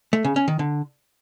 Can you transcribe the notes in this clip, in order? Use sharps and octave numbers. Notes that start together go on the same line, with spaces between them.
A3
C#3
C#4
D#3
D3